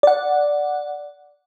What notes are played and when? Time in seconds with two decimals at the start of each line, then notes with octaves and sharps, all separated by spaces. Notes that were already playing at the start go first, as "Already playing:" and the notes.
0.03 D5 F#5